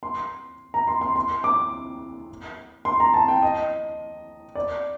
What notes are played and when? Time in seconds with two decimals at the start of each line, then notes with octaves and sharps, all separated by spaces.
0.03 C6
0.74 A#5
0.87 C6
1.01 C6
1.16 C6
1.44 D6
2.85 C6
3.00 A#5
3.14 A5
3.28 G5
3.42 D#5
4.55 D5